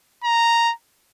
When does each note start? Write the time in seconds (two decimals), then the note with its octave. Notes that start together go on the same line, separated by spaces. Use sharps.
0.24 A#5